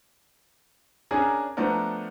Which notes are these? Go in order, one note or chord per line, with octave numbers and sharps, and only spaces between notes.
C#4 D4 G#4 A#4 G#5 A#5
F3 A3 B3 D4 A#4